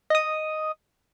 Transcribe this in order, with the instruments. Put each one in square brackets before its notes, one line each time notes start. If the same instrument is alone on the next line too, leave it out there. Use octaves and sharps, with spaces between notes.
[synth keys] D#5 D#6